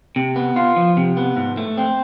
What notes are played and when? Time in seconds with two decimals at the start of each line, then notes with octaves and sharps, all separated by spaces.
0.16 C3
0.36 B3
0.56 F4
0.76 F3
0.97 C3
1.17 B3
1.37 G#2
1.57 A3
1.77 C4